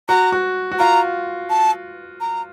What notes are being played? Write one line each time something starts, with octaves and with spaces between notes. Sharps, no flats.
F#4 A#5
F#4
F#4
F4 A#5
A5
A#5